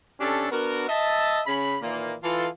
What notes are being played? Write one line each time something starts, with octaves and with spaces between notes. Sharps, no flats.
C3 C#4 D4 G4 A4
B3 D4 F#4 A#4
D#5 E5 A5
C#3 B5
A#2 D#3 E3 A#3
E3 F4 A4